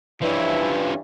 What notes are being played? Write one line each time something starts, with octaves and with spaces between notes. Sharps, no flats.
G2 E3 F3 C#4 E4